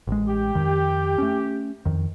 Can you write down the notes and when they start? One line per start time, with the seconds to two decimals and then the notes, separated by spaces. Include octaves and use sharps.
0.07 A1 G#3
0.27 G4
0.55 F2 D#3
1.18 A3 C#4
1.85 F2 D#3